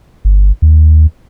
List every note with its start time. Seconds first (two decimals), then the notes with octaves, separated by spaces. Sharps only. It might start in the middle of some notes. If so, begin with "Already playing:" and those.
0.25 G1
0.62 D#2